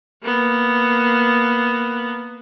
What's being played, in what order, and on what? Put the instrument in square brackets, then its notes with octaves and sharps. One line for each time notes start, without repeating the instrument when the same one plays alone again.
[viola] A#3 B3